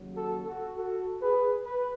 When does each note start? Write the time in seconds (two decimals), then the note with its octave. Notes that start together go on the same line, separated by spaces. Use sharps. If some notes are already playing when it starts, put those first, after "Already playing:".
Already playing: D#2 C#3 F#3
0.16 F#4 A4
0.46 F#4 A4
0.76 F#4 A4
1.22 G#4 B4
1.66 B4